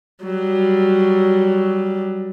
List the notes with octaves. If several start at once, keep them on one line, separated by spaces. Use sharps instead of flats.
F#3 G3